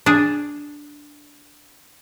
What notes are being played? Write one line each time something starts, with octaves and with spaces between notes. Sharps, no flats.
D4 G#4